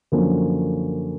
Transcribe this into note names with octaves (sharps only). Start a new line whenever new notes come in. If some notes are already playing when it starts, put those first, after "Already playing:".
F#2 D3 F3 A#3 C#4